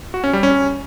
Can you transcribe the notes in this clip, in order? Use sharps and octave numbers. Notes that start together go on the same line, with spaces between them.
F#4
C#4
G3
C#4